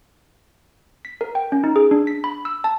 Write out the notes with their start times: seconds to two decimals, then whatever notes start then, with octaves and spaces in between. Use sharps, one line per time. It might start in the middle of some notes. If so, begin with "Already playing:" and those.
1.05 B6
1.21 A#4
1.35 G5
1.52 C#4
1.64 D#4
1.76 G#4
1.91 D4
2.07 B6
2.24 B5
2.45 E6
2.64 A5